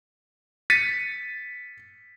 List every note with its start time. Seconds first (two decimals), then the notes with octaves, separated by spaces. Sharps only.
0.70 A6 B6 C#7 D#7